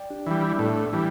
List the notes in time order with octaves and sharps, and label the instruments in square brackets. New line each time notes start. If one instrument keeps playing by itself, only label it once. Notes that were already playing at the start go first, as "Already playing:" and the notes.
Already playing: [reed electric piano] D5 G5
D4 G4
[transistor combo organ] E3 G3 [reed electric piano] D4
[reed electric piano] E4
D4
[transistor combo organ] A2 [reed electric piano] B3
[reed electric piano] D4
[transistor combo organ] E3 G3